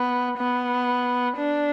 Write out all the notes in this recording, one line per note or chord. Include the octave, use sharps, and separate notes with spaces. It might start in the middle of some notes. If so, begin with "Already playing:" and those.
Already playing: B3
B3
D4